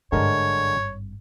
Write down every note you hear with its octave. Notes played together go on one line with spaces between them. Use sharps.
G#1 G2 D3 G#3 A#4 C#5